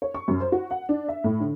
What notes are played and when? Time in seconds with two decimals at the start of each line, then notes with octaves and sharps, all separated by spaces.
0.02 C#5
0.14 C#6
0.28 F#2
0.40 C5
0.52 F#4
0.71 F#5
0.89 D4
1.08 E5
1.24 A2
1.40 D3